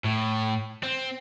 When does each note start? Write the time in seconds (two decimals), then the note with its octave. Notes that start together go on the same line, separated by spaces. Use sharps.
0.04 A2
0.83 C4